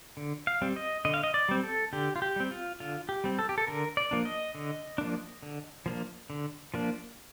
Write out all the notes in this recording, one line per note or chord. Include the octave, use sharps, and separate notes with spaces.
D3
F5
G3 C4
D#5
D3 D#5
F5
D#5
D5
G3 C4
A4
D3 G4
F4
G4
G3 C4
F4
D3 F4
G4
G3 C4
A4
G4
A4
D3 A#4
D5
F3 A#3 D4
D#5
D3
F3 A#3 D4
D3
F3 A#3 D4
D3
F3 A#3 D4